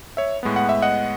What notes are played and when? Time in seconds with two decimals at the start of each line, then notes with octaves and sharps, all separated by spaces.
0.17 C#5 E5
0.43 A2 G#3 B3
0.56 F#5
0.69 E5
0.82 D#5 F#5